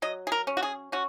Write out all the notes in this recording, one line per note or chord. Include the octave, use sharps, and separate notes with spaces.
F#3 D#5
G#4
A#4
C#4
F#4
G#4
C#4 F#4